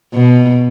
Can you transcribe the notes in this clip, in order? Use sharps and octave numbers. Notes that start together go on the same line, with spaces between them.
B2